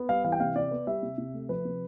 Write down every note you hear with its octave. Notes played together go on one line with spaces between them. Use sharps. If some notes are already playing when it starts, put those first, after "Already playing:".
Already playing: B3
G3 F5
E3 F5
G5
C3 F5
C3 D5
B3
G3 E5
C3
C3
A3
F3 B4
C3